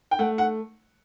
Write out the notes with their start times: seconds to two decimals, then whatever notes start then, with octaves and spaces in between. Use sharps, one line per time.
0.11 G5
0.19 A3 F#5
0.38 F#5